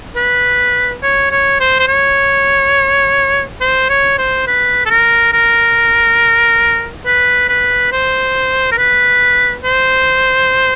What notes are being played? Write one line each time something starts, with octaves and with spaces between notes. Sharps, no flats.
B4
C#5
C#5
C5
C5
C#5
C5
C#5
C5
B4
A4
A#4
A#4
B4
B4
C5
A#4
B4
C5